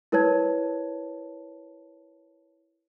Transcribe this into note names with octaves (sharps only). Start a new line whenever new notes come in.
E4 A#4 B4 C#5 A5 G#6